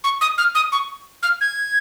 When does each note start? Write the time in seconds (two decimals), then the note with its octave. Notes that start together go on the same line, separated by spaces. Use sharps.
0.04 C#6
0.21 D#6
0.38 F6
0.55 D#6
0.72 C#6
1.23 F6
1.41 G#6